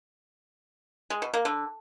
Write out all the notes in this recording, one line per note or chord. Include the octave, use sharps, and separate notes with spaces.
G#3
B2
A#3
D3